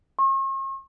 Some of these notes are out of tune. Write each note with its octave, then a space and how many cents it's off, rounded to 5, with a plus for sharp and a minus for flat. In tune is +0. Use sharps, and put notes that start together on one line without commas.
C#6 -45